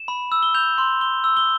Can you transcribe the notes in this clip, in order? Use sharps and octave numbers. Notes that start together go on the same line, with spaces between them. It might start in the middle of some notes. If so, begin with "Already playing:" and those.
Already playing: E7
B5
E6
G7
G6 F7
C6
C6 G7
E6
G7